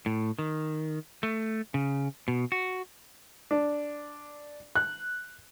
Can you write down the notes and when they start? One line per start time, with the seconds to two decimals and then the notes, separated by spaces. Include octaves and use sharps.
0.06 A2
0.39 D#3
1.23 A3
1.74 C#3
2.28 B2
2.52 F#4
3.51 D4
4.76 F#6